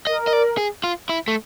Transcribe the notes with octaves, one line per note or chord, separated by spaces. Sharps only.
A#4 D#5
D#5
D5
G#4
F4
E4
A3